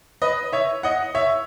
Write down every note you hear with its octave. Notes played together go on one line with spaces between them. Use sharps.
B4 D#5
C#5 E5
D#5 F#5
C#5 E5